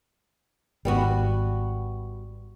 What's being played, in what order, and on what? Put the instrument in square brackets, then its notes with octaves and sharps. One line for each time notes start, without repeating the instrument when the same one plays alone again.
[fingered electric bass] G#1 [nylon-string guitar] G3 B3 F#4